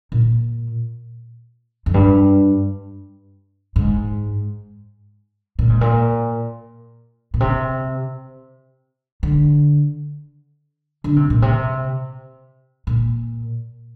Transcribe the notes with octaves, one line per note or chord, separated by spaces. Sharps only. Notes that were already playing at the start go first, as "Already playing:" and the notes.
A#2
F2
G2
G#2
A#2
G#2
A#2
A#2
C3
D3
D3
C3
A#2
C3
A#2